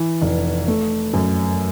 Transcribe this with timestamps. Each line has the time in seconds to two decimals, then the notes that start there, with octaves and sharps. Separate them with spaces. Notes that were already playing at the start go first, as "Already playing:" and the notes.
Already playing: E3
0.21 F1
0.68 A3
1.14 F#2